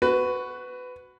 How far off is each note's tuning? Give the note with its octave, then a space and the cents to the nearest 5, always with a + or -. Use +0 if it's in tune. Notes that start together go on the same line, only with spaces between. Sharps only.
F#4 +0 B4 +20